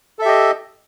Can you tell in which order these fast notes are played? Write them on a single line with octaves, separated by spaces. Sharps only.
A4 E5 G4 D#5